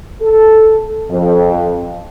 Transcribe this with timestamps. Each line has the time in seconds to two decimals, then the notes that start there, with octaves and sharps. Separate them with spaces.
0.22 A4
1.11 F2